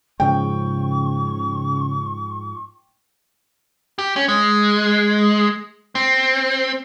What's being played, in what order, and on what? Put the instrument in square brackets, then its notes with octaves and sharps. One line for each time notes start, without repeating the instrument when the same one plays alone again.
[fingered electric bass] G#2 F3 [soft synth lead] C#3 [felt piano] G5 [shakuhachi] C#6
[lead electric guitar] G4
C#4
G#3
C4